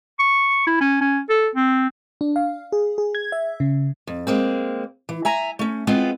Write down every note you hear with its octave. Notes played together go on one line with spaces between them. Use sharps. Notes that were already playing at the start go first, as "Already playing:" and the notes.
C#6
E4
C#4
C#4
A4
C4
D4
F5
G#4
G#4
G#6
E5
C#3
F2
G#3 A#3 C4
E3
E5 G#5 A#5
A3 C#4
G#3 B3 C4 F4